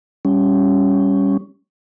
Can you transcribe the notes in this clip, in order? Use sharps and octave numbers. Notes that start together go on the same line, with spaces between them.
G3 C#4